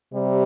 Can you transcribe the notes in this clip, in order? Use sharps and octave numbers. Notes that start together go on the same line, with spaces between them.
C3 G3